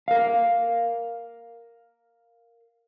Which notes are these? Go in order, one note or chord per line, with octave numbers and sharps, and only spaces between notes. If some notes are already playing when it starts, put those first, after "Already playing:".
A#4 F5